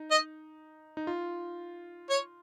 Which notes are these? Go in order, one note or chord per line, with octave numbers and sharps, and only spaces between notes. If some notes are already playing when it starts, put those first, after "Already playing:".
Already playing: D#4
D#5
D#4
F4
C#5